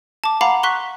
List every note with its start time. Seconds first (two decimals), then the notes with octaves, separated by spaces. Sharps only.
0.24 A5 D6
0.41 F5 F#5 A#5 B5 D6 C7
0.63 C6 C#6 F#6 B6